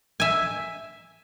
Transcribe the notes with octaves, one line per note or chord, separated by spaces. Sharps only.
E5 G#5